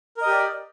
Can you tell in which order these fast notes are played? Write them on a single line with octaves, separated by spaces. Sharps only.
A#4 D#5 G4 D5